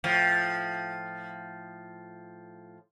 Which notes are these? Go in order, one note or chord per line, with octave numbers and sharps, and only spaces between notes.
A2 F3